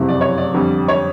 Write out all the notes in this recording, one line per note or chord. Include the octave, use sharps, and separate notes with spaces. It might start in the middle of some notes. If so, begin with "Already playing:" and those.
Already playing: F#1 F2 C3 E3
D5
C#5
D5
F2 D3 G3
C#5